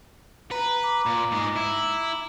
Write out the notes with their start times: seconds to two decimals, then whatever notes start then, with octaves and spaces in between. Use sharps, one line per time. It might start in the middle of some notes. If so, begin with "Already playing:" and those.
0.51 B4 A#5
0.83 A#5 D6
1.06 A#2
1.32 G#2 G#3
1.56 E4